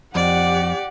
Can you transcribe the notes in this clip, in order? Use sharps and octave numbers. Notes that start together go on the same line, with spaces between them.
F2 G4 D5 F#5